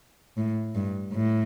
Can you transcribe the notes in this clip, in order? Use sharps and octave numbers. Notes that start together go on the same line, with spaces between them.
A2
G2
A2